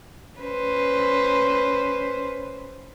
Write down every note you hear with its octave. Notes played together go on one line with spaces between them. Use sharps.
C#4 B4 C5